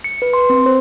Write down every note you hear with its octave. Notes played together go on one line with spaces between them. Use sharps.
C#7
B4
C6
C4
C5